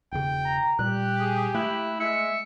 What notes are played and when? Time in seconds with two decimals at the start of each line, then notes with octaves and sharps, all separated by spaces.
0.12 E1 C#3 G5
0.45 A#5
0.79 A#2 G3 G4 F#6
1.20 G#4
1.55 A3 A#3 E4 F#6
2.00 G#3 E5 C#7